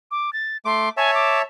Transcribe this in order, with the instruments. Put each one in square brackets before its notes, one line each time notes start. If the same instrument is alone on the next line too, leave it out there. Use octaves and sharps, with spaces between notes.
[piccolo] D6
A6
[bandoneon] A3 D6 [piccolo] C6
[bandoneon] C#5 E5 A5 [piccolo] G#5
[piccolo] D6